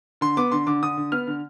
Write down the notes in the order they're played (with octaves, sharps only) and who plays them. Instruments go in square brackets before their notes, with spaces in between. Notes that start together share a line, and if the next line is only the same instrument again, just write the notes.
[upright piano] D3 C6
B3 D6
D3 C6
D3 D6
D3 D#6
D3
B3 F6
D3